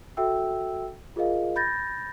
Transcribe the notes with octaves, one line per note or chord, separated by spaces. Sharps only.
F#4 A4 E5 G5 E6
F4 G#4 A#4 D#5 F5
B5 G6 A6 A#6